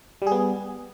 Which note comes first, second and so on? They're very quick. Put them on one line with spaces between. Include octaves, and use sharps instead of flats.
G3 G#4 B3